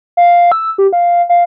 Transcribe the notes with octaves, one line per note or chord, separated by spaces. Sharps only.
F5
E6
G4
F5
F5